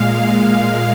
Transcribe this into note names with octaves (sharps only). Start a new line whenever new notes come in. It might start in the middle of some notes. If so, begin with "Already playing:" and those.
Already playing: A#2 G#3 F5
F5